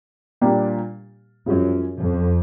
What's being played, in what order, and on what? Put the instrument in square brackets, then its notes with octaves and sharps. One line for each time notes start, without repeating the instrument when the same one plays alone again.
[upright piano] A#2 G3 A#3 D4 G4
[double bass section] F#2 [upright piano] F3 G#3 C#4
[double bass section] F2